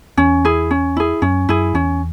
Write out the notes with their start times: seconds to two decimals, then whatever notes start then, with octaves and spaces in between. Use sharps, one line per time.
0.17 E2 C#4
0.45 E4 G#4
0.71 C#4
0.97 E4 G#4
1.22 F#2 C#4
1.49 F#2 E4 G#4
1.74 E2 C#4